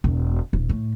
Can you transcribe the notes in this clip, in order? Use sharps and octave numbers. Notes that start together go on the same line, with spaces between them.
E1
D#1
A2